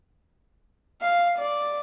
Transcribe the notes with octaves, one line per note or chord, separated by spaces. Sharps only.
F5
D5